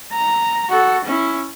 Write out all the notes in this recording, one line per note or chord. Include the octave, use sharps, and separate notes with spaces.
A#5
F#4 A4
C#4 E4